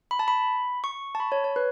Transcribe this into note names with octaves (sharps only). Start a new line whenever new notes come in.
B5
A5
B5
C#6
A5
B5
C#5
C#5
B4